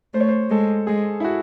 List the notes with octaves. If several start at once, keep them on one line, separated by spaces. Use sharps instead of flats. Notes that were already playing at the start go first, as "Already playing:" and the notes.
A3 C5
C#5
C5
G#3 A4
G#3 G#4
E4
F#4